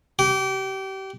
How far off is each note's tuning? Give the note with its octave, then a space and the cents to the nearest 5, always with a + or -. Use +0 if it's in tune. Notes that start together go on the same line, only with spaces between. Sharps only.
G4 -30